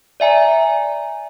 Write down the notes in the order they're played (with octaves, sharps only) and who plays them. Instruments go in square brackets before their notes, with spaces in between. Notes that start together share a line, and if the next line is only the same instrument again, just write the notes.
[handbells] D5 E5 G#5 A#5